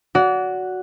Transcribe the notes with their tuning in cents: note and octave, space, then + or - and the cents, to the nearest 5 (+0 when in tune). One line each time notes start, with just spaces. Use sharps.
F#4 +0 D5 -35